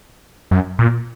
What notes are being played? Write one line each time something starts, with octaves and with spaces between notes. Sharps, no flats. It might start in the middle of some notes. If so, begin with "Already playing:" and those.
F#2
A#2